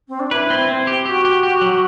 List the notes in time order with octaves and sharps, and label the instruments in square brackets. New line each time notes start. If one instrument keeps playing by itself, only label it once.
[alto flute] C4
D4
[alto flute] E4 [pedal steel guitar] B4
[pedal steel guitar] C4
C4
G4
[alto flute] F#4 [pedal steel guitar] G4
[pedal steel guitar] G4
G4
F#3